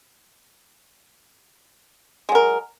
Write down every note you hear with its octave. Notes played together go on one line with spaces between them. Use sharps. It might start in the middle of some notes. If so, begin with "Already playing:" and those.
F#3 G#3 A#4